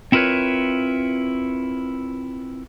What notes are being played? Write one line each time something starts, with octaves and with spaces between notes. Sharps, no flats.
C4 E4 F4 A#4 B4 C#5